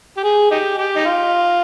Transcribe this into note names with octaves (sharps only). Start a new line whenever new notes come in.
G4
G#4
D#4 G4
G4
D#4
F4